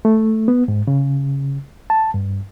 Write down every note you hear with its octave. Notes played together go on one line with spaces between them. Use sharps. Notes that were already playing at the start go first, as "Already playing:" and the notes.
A3
B3
G#2
C#3
A5
G2